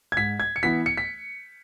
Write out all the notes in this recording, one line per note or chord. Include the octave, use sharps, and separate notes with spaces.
G#6
G#2 B6
G#6
C#7
E3 B3 E4 B6
C#7
B6